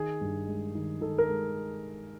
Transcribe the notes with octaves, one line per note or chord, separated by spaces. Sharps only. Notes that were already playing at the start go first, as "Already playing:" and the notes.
Already playing: D#3 G#4
G2
G#3
D#3
D#3 A4
A#4
G#3